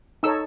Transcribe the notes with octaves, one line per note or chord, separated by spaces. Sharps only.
D#4 A4 C#5 E6